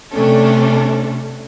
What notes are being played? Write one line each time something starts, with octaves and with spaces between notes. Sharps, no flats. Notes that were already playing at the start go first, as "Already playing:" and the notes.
C3 A3 C#4 D4 A4